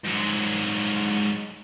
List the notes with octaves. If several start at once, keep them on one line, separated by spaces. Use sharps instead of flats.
G#2 F#3